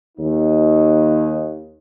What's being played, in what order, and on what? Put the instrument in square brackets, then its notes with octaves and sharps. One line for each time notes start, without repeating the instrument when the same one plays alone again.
[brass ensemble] D#2 D#4